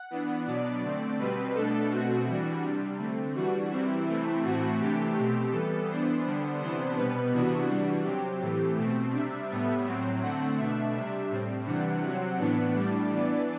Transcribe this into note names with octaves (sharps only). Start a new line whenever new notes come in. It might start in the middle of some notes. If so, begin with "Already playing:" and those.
Already playing: F#5
E3 B3 D4
B2 F#3 B3 D4 D5
D3 A3 C4
B2 G3 C4 B4
B2 A3 D4 A4
B2 A3 C4 F#4
E3 G3 D4
C3 G3 D4
D3 A3 C4
E3 G3 D4 F#4
C3 E3 G3 C4 E4
C3 E3 A3 C4
A2 E3 A3 C4 F#4
C3 E3 A3 D4 G4
B2 A3 C4
E3 G3 B3 A4
E3 B3 D4 C5
D3 G3 B3 D4
C3 E3 B3 D4 C5
B2 G3 B3 B4
C3 E3 B3 D4 F#4
E3 G3 D4 F#4
C3 F#3 C4 G4
A2 E3 A3 C4
B2 A3 C4
C3 G3 D4 E5
A2 G3 B3
A2 F#3 C4
D3 A3 C4 F#5
B2 A3 D4 E5
C3 G3 D4
A2 G3 C4
C3 E3 G3 D4 F#5
C3 F#3 C4 F#5
A2 E3 B3 D4
A2 G3 D4 D5
E3 B3 D4